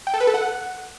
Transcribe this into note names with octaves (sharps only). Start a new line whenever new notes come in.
G5
A4
B4
A4
F#5